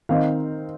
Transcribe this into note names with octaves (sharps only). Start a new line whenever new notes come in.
D#3 C4 D#4 F5